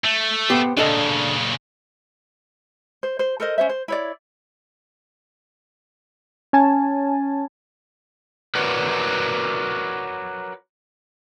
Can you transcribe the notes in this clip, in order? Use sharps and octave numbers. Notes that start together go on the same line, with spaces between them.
A3
B3 G4 C5
A#2 C#3 D4 A4 D#5
C5
C5
A4 A#4 C5 D#5
C#4 C5 E5
C5
E4 C#5 D5
C#4 G#5 A5
F#4 A#4 B4 C#5 D5